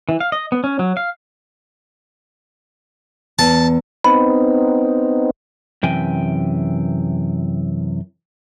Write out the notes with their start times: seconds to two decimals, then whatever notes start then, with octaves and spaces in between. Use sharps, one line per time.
0.09 E3
0.20 F5
0.32 D#5
0.52 B3
0.64 C#4
0.79 F#3
0.97 F5
3.39 E2 A5
4.04 B3 C4 D#4 B5
5.83 F#2 C3 E3 G5 G#5